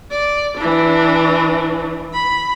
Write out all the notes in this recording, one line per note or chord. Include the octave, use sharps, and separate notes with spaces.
D5
E3 D4
B5